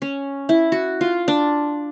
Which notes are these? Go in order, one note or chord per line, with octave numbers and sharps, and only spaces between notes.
C#4
E4
F#4
F4
D4